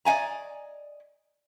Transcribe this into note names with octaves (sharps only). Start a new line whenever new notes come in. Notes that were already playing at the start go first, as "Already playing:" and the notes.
D5 D#5 F#5 G#5 A#5